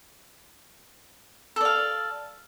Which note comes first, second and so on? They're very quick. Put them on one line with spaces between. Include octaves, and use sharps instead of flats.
A4 D5 F5